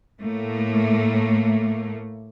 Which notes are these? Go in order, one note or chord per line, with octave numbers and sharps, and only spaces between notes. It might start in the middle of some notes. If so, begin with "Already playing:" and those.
A2 A3 A#3